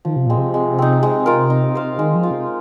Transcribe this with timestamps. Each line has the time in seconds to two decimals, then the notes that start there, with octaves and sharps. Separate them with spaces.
0.05 D#3 F3
0.16 C3
0.26 A#2 G#3 C4
0.37 C3
0.54 G#3
0.79 C4 D#4
1.03 G#3
1.26 F4 A#4
1.50 D#4
1.75 C5 F5
1.99 D#3 G#3
2.15 F3
2.23 C4 F4
2.31 C3